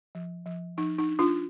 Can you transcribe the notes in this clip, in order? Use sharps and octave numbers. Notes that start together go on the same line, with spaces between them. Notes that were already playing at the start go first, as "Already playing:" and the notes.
F3
F3
F3 D#4
D#4
D4
D4 F4